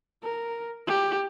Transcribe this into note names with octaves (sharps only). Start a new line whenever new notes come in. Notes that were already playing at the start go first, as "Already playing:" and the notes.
A#4
G4